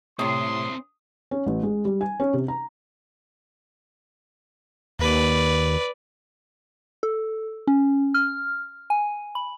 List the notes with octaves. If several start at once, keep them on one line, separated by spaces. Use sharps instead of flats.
A2 C3 C4 E4 C6 D#6
C#4
A1
G#3
G3
G#5
C#4
C3
A#5
D#2 B4 D5
A4
C#4
F6
G#5
B5